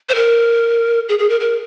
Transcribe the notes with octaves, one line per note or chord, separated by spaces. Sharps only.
C5
A#4
G#4
G#4
A#4
A#4